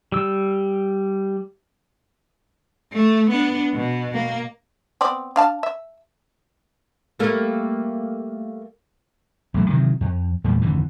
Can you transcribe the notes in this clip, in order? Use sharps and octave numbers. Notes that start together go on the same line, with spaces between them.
G3 E6
A3
B3 D4
B2
A#3
B3 C4 D5
D4 F5 A5
E5
G3 A3 A#3
A1 F#3 A3
C3 D#3 E3 F#3
F2
E2 A#2 G3 A3
G#1 F2 D3 E3